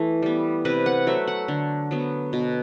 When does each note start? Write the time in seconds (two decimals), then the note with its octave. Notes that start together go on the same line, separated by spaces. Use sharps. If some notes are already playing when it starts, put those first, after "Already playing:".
Already playing: E3 A3
0.22 G3 B3
0.65 C3 B4
0.86 F#5
1.07 F#3 A3 E5
1.27 F#5
1.48 D3
1.91 F#3 B3
2.33 B2